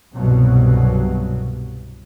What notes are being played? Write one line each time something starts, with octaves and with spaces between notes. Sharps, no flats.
C2 G2 B2 F#3